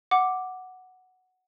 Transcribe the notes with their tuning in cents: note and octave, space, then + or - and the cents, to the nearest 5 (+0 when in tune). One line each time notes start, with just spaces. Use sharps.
F#5 +0 D6 +0